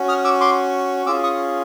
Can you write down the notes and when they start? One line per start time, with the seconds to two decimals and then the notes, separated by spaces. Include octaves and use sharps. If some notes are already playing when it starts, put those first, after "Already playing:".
Already playing: C#4 F#4
0.08 D#6 F6
0.25 D6 E6
0.41 C6 D6
1.06 C#4 F4 G#4 D6 E6
1.23 C#6 D#6